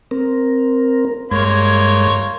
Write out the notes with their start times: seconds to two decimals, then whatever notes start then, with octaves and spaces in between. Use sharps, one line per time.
0.11 C4 A#4
1.32 G2 G#3 A#3 C#5 C6 G#6